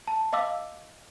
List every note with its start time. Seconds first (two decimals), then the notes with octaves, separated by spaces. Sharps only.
0.08 A5
0.33 D#5 F5 D6 E6